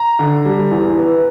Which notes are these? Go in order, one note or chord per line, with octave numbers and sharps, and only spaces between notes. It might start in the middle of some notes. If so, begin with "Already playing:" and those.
Already playing: A#5
D3
G3
E2
B3